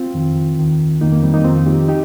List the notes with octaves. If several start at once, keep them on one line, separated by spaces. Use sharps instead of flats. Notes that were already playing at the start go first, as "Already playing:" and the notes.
Already playing: C4 F4
F2 D#3
D#2 D#3
F2 D#3 A#3 D#4
A#3
G3 C4
A#3 D#4
F2 D#3 C4 F4
D#4 G4
D#4 G4